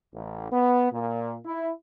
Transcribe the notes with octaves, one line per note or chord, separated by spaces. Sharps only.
A1
B3
A#2
E4